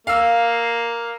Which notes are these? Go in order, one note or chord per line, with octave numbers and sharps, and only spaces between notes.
A#3 F5 E6